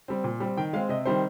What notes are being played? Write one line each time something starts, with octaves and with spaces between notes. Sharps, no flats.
G3 C4
A#2
G3 C4
D#3 G5
G#3 C4 F5
C3 D#5
D#3 G3 C4 C5